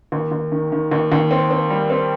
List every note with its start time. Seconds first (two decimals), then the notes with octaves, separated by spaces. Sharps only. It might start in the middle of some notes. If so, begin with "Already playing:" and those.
0.12 D#2
0.31 D#2
0.52 D#3
0.72 D#3
0.92 D#2
1.12 D#2
1.31 C4
1.51 C4
1.70 G3
1.90 C4